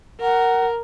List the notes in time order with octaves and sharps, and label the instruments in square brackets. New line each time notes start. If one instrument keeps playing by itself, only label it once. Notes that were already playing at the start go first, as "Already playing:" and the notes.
[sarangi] A#4 [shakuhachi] F#5